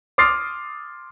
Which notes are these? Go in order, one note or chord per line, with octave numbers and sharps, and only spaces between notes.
C6 D6 D#6 F6 A6 C7